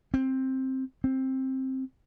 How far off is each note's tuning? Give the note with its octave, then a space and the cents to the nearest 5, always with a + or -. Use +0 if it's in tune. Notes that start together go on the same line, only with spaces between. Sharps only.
C4 +10
C4 +10